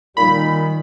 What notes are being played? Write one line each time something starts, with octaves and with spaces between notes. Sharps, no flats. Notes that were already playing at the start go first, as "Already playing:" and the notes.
A#2 D#3 G3 D#4 B5